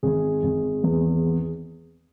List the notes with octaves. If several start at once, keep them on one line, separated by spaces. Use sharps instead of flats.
G#1 G#4
G#1
E2